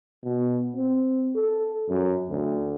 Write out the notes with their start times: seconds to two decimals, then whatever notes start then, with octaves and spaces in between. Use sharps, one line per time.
0.24 B2
0.75 C4
1.35 A4
1.89 F#2
2.30 D2